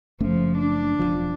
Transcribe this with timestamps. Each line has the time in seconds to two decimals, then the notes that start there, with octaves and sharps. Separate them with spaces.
0.20 F#1 F3 A3 C#4
0.58 D4
0.99 E1 B1 F3